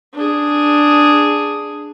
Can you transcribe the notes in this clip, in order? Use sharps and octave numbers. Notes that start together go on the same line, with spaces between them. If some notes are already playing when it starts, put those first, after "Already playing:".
D4 G#4